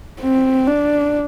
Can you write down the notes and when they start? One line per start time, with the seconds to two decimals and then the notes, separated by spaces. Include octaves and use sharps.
0.20 C4
0.67 D4